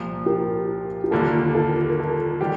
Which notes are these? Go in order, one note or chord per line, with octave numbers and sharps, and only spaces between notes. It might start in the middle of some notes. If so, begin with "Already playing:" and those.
Already playing: C2 A#2 F3 A#3
G4 A#4
G4
D#2 D3 G3 A#3 F4 A4
F4 A4
A4
A#4
F4 A4
D#3 G3 D4 G4